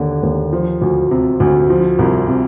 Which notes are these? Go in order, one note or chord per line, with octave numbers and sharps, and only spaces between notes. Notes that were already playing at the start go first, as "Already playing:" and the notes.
Already playing: D#2 D3
D#2
F3
D2
C3
D2
F3
C2
C3